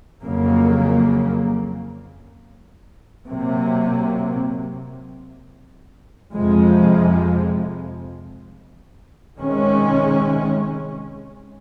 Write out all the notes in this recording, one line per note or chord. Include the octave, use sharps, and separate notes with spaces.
F2 C#3 F#3 A#3
C3 F#3 A#3
F2 C3 F3 G#3
C3 D#3 G#3 C#4